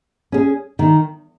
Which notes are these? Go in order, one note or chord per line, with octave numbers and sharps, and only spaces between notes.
C#4 G#4
D#3